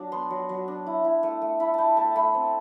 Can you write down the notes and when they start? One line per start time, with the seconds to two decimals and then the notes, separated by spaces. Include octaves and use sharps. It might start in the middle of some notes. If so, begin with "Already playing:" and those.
Already playing: F#3 D4
0.12 B3 C6
0.30 F#3
0.49 F#3
0.68 D4
0.86 E4
1.04 E4
1.23 A3
1.41 A3
1.60 E4 B5
1.74 E4 G5 A5
1.97 A3 A5
2.15 A3 B5
2.34 C4